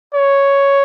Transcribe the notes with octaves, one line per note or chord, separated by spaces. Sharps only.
C#5